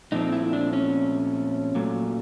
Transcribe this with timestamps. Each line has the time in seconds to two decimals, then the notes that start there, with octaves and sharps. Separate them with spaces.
0.12 A#2 F3 A3 C4 D#4
0.32 E4
0.53 D4
0.73 C#4
1.75 A#2 F#3 A3